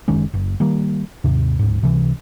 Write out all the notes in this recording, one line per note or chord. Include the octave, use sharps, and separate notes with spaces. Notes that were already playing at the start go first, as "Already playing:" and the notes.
F#1 D#3 G#3 C#4
F#1
D#3 G3 A#3
D#2 G#2 C3
D1 G#2
C#2 C3 E3